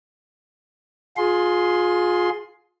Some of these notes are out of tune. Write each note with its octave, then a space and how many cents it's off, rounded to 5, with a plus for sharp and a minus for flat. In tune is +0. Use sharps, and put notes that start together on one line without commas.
F4 +30 G#4 +15 C6 +0